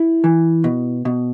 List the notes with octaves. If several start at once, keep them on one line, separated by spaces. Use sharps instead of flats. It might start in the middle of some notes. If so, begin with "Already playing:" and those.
Already playing: E4
E3
B2
B2